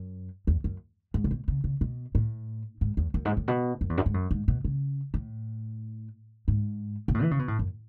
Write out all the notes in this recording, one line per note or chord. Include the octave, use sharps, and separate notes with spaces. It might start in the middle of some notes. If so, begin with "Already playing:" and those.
Already playing: F#2
E2
F#2
G#2
C#3
B2
C#3
C#3
B2
A2
G#2
E2
F#2
G#2
A2
B2
F#2
E2
F#2
G#2
F#2
G#2
B2
C#3
A2
G#2
B2
A2
E3
C#3
B2
A2
F#2